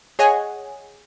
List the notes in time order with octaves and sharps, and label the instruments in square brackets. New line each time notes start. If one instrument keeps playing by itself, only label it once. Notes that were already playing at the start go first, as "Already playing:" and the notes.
[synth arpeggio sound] G#4 C#5 D#5 F#5 G#5